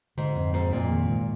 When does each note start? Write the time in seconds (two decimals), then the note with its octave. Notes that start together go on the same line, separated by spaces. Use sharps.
0.17 G#2 D3
0.36 F2
0.54 G#2 F3
0.73 F2 A#2
0.92 D#3
1.10 G#2